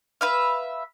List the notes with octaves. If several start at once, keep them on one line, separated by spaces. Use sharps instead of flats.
B4 E5 F5